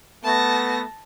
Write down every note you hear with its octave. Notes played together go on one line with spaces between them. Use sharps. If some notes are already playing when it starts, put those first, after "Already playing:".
A3 B3 A5 A#6